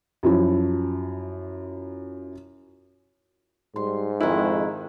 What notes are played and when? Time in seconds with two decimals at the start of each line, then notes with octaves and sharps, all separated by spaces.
0.23 F#2 F3 E4
3.76 G#2 G3 C6
4.20 F2 D#3 G#3 E4